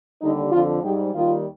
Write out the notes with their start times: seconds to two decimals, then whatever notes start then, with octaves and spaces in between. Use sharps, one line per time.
0.20 D#2 D3 G3 D#4
0.51 F2 D3 F3 F4
0.82 G#2 G3 G4
1.13 D#2 D#3 G3 F4